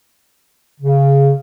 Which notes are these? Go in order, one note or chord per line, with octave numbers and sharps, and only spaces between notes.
C#3